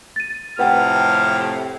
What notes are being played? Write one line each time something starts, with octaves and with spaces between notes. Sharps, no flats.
A6 D#7
F2 A2 C3 B4 F#5 G5 F6